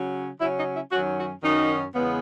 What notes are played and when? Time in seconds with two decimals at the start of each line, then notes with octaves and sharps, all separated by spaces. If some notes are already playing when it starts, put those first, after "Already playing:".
Already playing: C#3 F#3 C#4
0.40 C#3 F#3 C#4 E4
0.57 D#4
0.75 E4
0.91 F#2 D#3 F#3 C#4 F#4
1.17 F#4
1.43 F#2 D#3 F#3 C#4 D#4
1.94 E2 C#3 G#3 B3